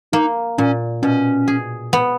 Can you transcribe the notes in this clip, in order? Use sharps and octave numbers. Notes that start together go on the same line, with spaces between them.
A#3 D#4
A#2 C#4
B2 C#4
G#4
B3